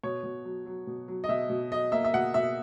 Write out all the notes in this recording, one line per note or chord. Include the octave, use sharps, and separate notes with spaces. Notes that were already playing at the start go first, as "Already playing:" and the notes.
B2 C#5
B2
F#3
F#3
B2
F#3
D#5
B2 E5
B2
F#3 D#5
A#3 E5
E5
B2 F#5
B2 E5